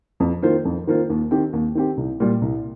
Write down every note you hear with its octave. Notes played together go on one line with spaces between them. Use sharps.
F2
D#3 A#3 F4 C5
F2
D#3 A#3 F4 C5
D#2
D#3 C4 G4
D#2
D#3 C4 G4
C2
A#2 G3
C2